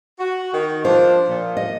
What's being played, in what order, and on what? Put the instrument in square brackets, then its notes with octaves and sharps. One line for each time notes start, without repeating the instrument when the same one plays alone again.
[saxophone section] F#4
D#3
[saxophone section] F3 D4 [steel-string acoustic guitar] C5
[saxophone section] A#2 F3
[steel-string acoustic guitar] D#5